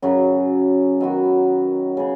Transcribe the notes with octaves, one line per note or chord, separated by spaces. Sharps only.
F#2 C#3 F#3 C#4
F#2 D#3 B3 F#4
C#3 B3 G#4